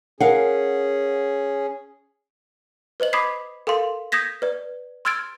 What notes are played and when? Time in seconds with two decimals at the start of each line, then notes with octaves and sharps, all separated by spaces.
0.20 C#4 G#4 A#4 F5 F#5
3.00 B4 C5 D#5 F#7
3.13 B5 D6 D#6 G#6 B6 C7
3.67 A4 A#4 F5 C6
4.12 D#6 G6 G#6 A#6 B6
4.42 B4 D5
5.05 C6 E6 F6 G#6 A6 D7